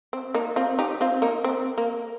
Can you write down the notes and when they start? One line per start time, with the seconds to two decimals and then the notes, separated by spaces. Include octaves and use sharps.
0.13 C4
0.34 A#3 D#4
0.56 C4 F4
0.79 D#4 G4
1.01 C4 F4
1.22 A#3 D#4
1.44 C4
1.78 A#3